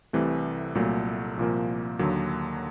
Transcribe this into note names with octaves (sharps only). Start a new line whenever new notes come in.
C2 C3 E3 A3
C2 A#2 F#3 A3
C2 A#2 F3 A#3
D#2 D3 F#3 A#3